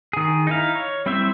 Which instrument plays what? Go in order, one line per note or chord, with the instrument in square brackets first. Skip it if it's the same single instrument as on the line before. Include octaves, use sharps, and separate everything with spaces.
[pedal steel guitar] D#3 G#4
D#4 E4 F5
C#5
G3 C4 E4 C5 E5